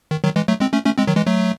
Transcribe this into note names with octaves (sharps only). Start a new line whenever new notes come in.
D#3
D#3 F#3
E3 G#3
F#3 A3
G#3 C4
A3 C#4
A3 C#4
G#3 C4
D#3 F#3
E3 G#3
F#3 A3